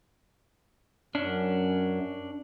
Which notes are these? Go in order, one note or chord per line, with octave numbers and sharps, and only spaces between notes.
F#2 C#4 D4